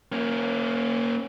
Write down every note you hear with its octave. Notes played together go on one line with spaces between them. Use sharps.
A#3 C#4